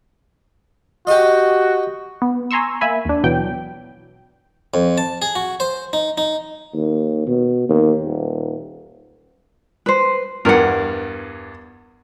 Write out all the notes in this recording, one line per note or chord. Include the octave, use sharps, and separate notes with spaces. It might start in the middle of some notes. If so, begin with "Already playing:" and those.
F#4 G4 D#5
B3
G#5 A#5 C6 C#6 E6
A#3 E5 G#5 B5
D#2 D4
B2 E3 F#3 G5
F2
A5
G#4
F#4
C5
D#4
D#4
D#2
B2
D#2
D#1
B4 C5
E2 G2 A#4 F#5